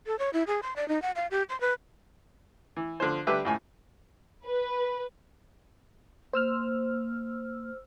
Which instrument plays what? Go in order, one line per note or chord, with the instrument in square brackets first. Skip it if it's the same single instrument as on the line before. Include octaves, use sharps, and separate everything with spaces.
[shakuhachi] A4
C#5
E4
G#4
C6
D5
D#4
F#5
F5
G4
C6
B4
[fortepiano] E3
D3 F3 C5
D3 G3 G4 B4 E5 D6
C#2 A2 G#5
[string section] B4
[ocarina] A#3 [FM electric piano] C5 E6 F6